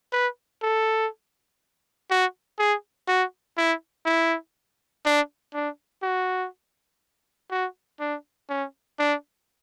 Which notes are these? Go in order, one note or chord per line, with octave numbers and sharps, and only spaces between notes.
B4
A4
F#4
G#4
F#4
E4
E4
D4
D4
F#4
F#4
D4
C#4
D4